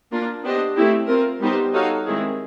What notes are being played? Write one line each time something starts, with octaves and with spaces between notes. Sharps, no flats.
A#3 D4 F4 A#4
B3 D4 G4 C5 D#5
A3 C4 E4 G4
C4 F4 A#4
G3 B3 D#4 G4 C5
D#4 F#4 A4 C#5 F5
D#3 G#3 C4 E4 G#4